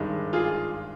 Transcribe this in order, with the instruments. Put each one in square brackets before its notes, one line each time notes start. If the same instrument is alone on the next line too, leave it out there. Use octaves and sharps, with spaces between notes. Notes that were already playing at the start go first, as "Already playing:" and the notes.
Already playing: [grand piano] G#1 G2 D#3 G#3
F4 G#4